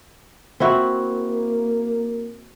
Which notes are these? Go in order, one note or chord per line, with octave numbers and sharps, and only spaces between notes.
A#3 C4 E4 F#4